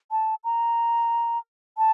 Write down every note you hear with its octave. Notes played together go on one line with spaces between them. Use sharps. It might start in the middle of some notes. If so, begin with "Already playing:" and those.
A5
A#5
A5